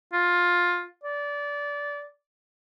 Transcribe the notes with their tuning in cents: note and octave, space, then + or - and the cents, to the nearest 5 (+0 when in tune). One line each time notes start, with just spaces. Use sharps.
F4 +15
D5 -20